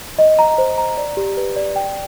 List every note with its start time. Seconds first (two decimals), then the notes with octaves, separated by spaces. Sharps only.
0.19 D#5
0.39 A#5
0.58 C5
0.78 A#5
0.97 D5
1.17 G4
1.37 B4
1.56 D5
1.76 G5